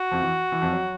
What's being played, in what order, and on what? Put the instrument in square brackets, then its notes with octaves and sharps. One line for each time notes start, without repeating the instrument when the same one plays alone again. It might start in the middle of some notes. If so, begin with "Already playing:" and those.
Already playing: [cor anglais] F#4
[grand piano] F2 F3
E3
E3
F2 F3
F#3